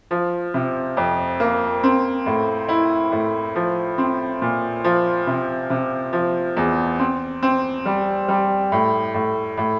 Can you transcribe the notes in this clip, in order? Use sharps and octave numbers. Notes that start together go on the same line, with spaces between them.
F3
C3
F2
A#3
C4
A2
E4
A2
F3
C4
A#2
F3
C3
C3
F3
E2
C4
C4
G3
G3
A2
A2
A2